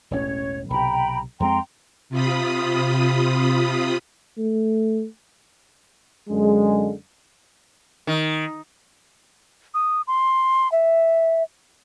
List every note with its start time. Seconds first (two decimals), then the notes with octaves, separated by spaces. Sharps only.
0.11 E1 A1 C#4 C#5
0.70 B1 C3 G5 A#5 B5
1.40 F2 G#3 C4 G5 A#5 C6
2.09 C3 F4 B5 D#6
4.38 A3
6.30 F#2 D3 G#3
8.07 D#3
9.74 D#6
10.07 C6
10.72 E5